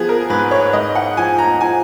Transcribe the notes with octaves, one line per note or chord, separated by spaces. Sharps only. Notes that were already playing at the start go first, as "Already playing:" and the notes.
Already playing: F3 B3 G#4
A#4
G#2 B4
C#5
G#2 D#5
F#5
F3 G#5
A#5
F3 G#5